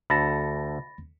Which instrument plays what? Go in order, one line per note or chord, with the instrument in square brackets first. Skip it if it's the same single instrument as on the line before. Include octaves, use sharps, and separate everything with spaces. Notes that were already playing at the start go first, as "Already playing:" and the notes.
[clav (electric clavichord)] D2 A4 A5 [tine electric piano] B5 A6 A#6